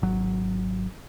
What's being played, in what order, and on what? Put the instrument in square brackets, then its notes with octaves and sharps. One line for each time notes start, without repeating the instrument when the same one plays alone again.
[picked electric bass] G#1 F#3